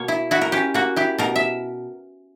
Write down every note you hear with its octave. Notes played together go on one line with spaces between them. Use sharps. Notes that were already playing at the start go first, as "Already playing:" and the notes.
Already playing: B2 A#3 C#5
E4
E4 F#4
A#4
C#4 G4
A#3 F#4
E4 G4
B2 A#4
E5